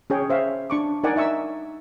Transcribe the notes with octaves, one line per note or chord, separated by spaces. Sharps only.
C#4 G#4 C#5 G5
C5 E5 F5
D4 C#6 D6
D#4 A#4 D5 F#5 G#5
D#4 E5 C#6 E6